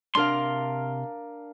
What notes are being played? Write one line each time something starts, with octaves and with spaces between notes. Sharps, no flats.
C3 D4 A#4 F5 C6